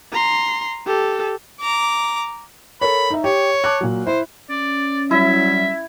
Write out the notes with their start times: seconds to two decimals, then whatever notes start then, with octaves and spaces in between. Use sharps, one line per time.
0.12 A#5 C6
0.86 G4 A4
1.61 A#5 D6
2.81 A4 A#4 C#5 B5
3.10 D#4 E5
3.24 G4 C#5
3.64 A5 D6 F#6
3.81 A#2 F#3
4.07 E4 C5
4.50 C#4 D5
5.11 F#3 G3 E4 E5